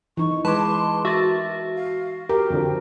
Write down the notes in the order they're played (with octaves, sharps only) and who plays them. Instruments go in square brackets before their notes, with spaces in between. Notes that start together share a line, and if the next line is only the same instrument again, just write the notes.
[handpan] E3 D#4 [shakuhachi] C#6
[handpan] G#3 [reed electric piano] B4 D6 [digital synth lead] A5 [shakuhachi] C6
[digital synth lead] F#4 [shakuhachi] A#4 [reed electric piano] E5 A6
[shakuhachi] F5
[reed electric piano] G4 [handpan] A#4 [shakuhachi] G5
[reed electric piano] F2 D3 F3